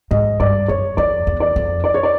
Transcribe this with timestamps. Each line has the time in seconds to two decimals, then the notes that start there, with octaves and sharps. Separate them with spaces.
0.11 G#2 D#5
0.40 G2 D5
0.68 F#2 C#5
0.97 F2 D5
1.27 E2
1.40 D5
1.56 F2
1.84 D5
1.94 C#5
2.03 D5